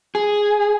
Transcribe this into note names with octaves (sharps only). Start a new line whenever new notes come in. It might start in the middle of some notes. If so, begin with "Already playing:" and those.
G#4